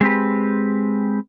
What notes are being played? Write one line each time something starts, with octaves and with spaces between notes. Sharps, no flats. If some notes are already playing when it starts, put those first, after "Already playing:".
G#3 C4 G4 B4